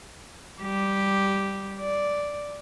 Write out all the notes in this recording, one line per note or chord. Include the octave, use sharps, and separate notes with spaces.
G3 G4
D5